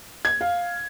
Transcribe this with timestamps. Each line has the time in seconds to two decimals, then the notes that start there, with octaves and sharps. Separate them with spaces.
0.25 G#6
0.41 F5